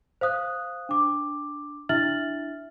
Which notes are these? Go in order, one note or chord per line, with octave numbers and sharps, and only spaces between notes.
C5 F5 D#6 F#6
D4 D6
D4 E4 E5 F6 A6 F#7